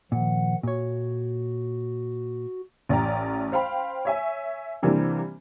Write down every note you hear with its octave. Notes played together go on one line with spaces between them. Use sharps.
A#2 D#3 F3 F#5
A#2 F#4 C#5
A1 D5 G5 A#5
C5 F5 G5 B5
C#5 E5 G#5
C3 E3 G3 A#3 C4 D4